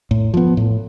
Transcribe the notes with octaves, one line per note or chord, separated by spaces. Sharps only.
A2
F3 B3
A2